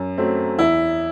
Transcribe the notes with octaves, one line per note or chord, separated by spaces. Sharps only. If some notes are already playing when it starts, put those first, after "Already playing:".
Already playing: F#2
F#3 A3 C4
E2 E4